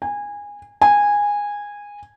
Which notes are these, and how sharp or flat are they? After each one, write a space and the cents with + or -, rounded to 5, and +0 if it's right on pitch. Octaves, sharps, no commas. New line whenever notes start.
G#5 -20
G#5 -15